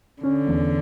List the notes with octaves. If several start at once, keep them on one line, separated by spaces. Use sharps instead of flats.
D3 C#4
E2